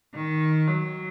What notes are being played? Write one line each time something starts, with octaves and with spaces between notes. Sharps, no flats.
D#3
F#3